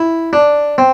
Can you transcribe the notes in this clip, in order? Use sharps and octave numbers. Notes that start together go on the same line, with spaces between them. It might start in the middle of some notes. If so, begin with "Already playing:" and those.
Already playing: E4
D4
C4